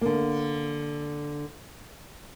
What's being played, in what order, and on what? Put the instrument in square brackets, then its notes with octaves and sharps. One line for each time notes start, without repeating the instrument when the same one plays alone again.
[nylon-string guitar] D3 A#3